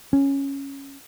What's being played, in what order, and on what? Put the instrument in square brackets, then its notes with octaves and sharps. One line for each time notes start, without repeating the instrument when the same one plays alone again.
[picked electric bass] C#4